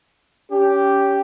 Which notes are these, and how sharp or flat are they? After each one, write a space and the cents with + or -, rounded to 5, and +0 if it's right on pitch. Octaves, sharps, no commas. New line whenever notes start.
C#4 +30 G4 +0